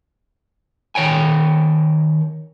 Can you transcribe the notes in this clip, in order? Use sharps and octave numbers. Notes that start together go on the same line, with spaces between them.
D#3 C#5 G5 G#5